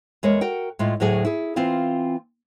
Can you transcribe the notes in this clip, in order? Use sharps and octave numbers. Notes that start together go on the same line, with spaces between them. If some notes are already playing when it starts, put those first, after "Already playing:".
E2 G#3 A#4 C#5
F#4 A#4 G5
A2 G#3 F4
D2 A2 F#3 G#4 G#5
E4 G#4
E3 C4 F4 F5